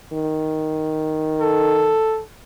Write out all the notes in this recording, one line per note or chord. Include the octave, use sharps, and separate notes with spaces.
D#3
A4